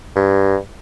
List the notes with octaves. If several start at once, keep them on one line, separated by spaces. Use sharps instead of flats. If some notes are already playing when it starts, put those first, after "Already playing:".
G2